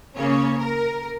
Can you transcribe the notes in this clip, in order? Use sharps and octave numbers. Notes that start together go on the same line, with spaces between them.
C#3 A#3 C#4 C#5
A#4